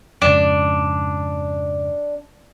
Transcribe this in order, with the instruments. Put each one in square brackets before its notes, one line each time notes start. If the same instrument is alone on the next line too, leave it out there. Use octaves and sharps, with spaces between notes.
[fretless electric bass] F2 G#2 C#3 [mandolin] D4